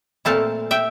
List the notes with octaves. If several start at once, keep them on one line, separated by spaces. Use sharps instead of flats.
A#2 A3 C4 E4 F5 A5
E5 G5